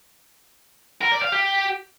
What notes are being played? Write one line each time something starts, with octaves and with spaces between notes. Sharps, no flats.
A#4
D5
F5
G4